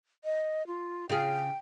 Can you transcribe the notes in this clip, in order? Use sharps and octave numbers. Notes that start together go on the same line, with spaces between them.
D#5
F4
C#3 F4 G#4 G5